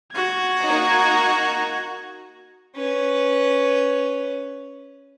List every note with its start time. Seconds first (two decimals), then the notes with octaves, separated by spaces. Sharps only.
0.14 F#4 G#6
0.63 A#3 D#4 A#5
2.76 C#4 B4